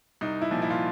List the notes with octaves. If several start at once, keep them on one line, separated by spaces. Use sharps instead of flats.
C2 D#4
E4
A#2 F3
E4
F4